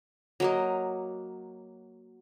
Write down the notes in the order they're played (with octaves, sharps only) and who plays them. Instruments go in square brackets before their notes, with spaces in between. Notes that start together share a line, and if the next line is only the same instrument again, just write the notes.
[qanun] F#3 A#3 D#5